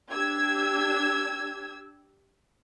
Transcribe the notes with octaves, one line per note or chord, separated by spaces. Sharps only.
D4 G4 E6 G#6